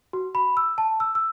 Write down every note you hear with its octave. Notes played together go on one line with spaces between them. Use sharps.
F#4
B5
E6
A5
E6
E6